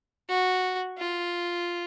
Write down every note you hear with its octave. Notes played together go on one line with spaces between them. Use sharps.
F#4
F4